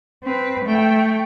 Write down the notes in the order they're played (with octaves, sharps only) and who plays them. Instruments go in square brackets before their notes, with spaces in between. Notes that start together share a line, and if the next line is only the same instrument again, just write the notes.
[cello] C4 B4
A3 G5